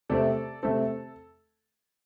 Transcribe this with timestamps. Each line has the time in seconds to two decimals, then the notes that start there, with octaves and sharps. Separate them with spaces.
0.09 C3 A3 C4 A4 D5
0.63 C3 A3 C4 A4